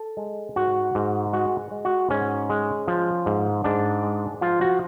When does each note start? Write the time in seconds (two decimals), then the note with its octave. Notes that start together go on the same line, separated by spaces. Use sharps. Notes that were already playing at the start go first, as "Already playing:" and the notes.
Already playing: A4
0.17 G#3
0.56 G#2 F#4
0.95 G#2
1.33 G#3 F#4
1.71 G#3
1.85 F#4
2.10 G#2 C#4
2.50 G#3
2.88 F3
3.26 G#2
3.64 G#2 D4
4.03 G#3
4.41 F3 F4
4.61 F#4